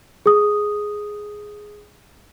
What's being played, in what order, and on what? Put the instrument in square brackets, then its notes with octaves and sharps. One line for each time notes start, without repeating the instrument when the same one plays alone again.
[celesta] G#4 D#6